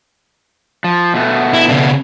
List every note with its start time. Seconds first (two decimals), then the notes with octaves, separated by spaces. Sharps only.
0.84 F3
1.14 B2 A3 B3
1.54 E4
1.69 C#3 D4